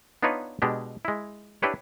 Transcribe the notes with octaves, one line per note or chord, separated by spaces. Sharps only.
B3 D4 D#4 F4 B4 C#5
B2 G#3 D4 G4
G#3 E4
D4 E4 G4 B4 C#5